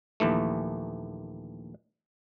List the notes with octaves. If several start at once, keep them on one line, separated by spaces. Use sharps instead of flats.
A#1 D#2 E3 A3